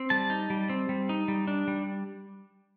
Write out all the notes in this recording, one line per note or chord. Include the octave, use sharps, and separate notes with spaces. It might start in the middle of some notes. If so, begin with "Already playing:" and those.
Already playing: C4
G3 A5
D#4
G3
C4
G3
D#4
G3
D4
G3